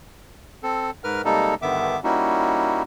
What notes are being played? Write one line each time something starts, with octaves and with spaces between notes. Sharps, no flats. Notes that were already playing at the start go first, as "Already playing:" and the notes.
C4 A4
G#2 A#4 B4 F6
C3 G3 G#3 A#3 D#4 A4
G2 D3 D#3 B3 E5 D6
G3 A#3 C#4 D#4 E4 F#4